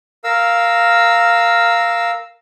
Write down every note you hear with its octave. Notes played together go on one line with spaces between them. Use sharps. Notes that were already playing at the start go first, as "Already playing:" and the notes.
A#4 F5 E6